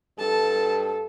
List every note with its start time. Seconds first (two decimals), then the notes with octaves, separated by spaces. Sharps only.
0.19 G2 A4 A5